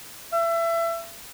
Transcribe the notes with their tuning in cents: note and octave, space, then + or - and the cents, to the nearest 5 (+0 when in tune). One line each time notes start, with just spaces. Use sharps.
E5 +25